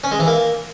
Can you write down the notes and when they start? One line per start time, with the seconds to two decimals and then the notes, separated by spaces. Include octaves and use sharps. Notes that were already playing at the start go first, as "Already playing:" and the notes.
0.04 C#4
0.11 G#3
0.19 E3
0.27 A#3